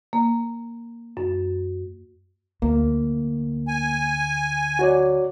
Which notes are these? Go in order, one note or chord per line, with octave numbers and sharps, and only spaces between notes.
A#3
F#2
D2 A#3
G#5
F#4 C#5 D5